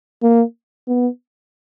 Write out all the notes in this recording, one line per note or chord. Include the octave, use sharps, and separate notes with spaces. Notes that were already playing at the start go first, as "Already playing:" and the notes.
A#3
B3